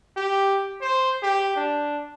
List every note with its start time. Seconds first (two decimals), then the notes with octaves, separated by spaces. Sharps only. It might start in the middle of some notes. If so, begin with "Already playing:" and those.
0.17 G4
0.81 C5
1.23 G4
1.56 D4